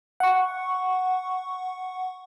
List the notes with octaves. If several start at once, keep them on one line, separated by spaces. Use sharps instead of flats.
F#5 C#6